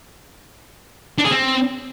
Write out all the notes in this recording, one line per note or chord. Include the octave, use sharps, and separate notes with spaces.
D4
G#4
C4